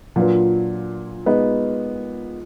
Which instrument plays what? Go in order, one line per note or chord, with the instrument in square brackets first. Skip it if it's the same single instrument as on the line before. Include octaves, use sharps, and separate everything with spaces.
[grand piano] A#2 [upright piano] F#3 D4 F4 B4
[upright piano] G#3 B3 D#4